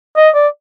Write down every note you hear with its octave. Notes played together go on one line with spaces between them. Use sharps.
D#5
D5